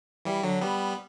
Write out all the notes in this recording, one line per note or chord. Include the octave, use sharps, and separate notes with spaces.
E3 G3
D3 F#3
G3 B3